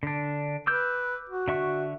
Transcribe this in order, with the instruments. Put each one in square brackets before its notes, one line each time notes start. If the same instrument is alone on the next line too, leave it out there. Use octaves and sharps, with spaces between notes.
[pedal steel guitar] D3 D4
[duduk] B4 [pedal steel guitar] D6 E6 G6
[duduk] F#4
[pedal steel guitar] D3 E5 C#6